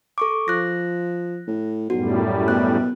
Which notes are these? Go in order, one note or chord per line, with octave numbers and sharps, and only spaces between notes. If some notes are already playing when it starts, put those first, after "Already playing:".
A4 C#6 D6
F3 F#6 A#6
A2
B1 F#2 A2 G3 F#4
B2 F#6